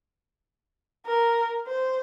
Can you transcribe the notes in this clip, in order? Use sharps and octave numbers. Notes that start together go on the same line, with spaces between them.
A#4
C5